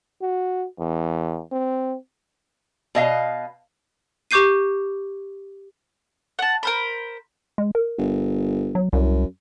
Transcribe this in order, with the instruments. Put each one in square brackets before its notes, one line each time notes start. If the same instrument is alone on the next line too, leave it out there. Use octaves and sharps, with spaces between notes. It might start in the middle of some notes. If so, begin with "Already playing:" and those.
[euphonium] F#4
E2
C4
[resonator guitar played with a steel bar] B2 D#5 F5
[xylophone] G4 C#6 D6 G6 C7 D#7
[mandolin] F#5 A5
A#4 C5 B5
[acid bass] G#3
A#4
[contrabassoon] G1
[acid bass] F#3
[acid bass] C2 [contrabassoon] F#2